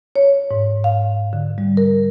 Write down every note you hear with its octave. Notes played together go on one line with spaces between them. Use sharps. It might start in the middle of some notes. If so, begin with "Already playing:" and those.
C#5
G#2
F5
D3
G3
A#4